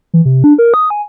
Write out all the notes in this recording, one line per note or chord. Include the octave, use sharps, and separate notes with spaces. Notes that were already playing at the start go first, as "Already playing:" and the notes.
E3
C3
D4
A#4
D#6
G#5